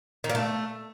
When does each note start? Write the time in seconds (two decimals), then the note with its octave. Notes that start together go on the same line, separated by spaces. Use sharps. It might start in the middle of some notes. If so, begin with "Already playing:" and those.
0.24 D#3
0.29 A#2
0.35 A3